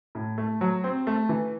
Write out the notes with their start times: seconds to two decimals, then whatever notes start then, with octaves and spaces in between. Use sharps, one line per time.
0.15 A2
0.38 A3
0.61 F#3
0.84 C4
1.07 A3
1.29 E3